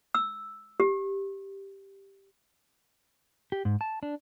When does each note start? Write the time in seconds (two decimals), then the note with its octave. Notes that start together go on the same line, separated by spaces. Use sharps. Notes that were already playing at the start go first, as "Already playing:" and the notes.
0.14 E6
0.80 G4
3.52 G4
3.65 G#2
3.81 A5
4.03 D4